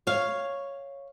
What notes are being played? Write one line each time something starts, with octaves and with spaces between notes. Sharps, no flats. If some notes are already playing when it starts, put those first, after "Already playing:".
C#5 F5